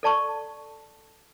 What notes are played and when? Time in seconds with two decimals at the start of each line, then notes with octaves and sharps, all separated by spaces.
0.03 A4 D5 A5 C#6